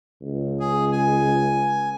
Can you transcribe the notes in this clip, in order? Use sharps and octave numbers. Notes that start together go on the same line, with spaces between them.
C#2
G#4
G#5